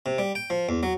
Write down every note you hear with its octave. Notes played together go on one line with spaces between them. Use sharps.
C3
G3
G5
F3
E2
F#3